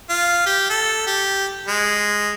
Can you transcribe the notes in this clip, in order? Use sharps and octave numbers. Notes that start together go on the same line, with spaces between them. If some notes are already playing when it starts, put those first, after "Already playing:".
F4
G4
A4
G4
G#3